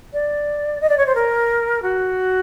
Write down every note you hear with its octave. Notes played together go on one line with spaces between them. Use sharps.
D5
D#5
D5
C#5
C5
A#4
F#4